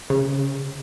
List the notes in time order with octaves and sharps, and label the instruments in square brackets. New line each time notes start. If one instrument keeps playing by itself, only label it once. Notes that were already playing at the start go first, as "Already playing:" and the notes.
[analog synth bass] C#3